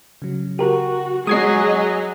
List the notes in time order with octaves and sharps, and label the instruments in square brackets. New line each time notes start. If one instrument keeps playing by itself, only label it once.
[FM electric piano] C#3 F#3
[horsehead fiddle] F#4 [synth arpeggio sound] G4 A#4
[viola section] F#3 [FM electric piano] G#3 [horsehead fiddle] G#4 D#5 [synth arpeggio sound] D#6 G#6 C7